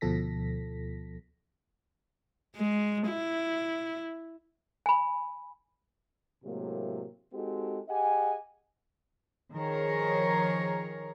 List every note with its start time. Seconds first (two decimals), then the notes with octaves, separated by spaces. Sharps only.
0.01 D2 B2 F3 A4 A#6 B6
2.56 G#3
3.08 E4
4.86 G#5 B5
6.44 A2 C3 F#3 G#3 A#3
7.33 G#3 C4 D#4 F#4 G4 A4
7.89 G4 G#4 D#5 F#5 G#5
9.54 D#3 F3 G#4 A#4 C#5